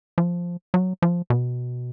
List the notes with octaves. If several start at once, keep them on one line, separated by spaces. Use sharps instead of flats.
F3
F#3
F3
B2